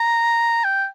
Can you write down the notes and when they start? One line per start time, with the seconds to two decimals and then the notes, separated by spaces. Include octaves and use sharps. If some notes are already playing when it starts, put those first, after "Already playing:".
Already playing: A#5
0.64 G5